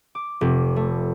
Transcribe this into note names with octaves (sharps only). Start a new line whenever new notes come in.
D6
F1
A3